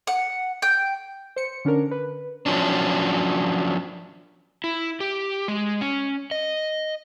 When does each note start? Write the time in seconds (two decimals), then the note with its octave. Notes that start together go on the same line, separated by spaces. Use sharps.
0.07 F#5
0.62 G5
1.36 C5 C#7
1.65 D3 C#4 D4 A#4
1.91 B4
2.46 F3 F#3 C#4 D4
4.64 E4
5.00 G4
5.48 G#3
5.81 C#4
6.31 D#5